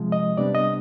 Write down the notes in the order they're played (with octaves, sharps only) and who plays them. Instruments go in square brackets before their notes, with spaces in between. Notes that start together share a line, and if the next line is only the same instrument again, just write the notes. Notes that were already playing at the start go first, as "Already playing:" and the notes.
Already playing: [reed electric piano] C3 F3 G#3
D#5
C3 G3 B3 D4 D5
D#5